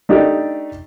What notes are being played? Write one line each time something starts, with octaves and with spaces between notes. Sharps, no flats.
A3 D4 D#4 G4